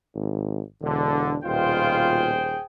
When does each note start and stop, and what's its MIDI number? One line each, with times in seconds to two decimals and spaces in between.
0.15 0.61 32
0.81 1.36 28
0.81 1.36 50
1.44 2.55 27
1.44 2.33 47
1.44 2.33 65
1.44 2.63 68
1.44 2.63 72
1.44 2.63 79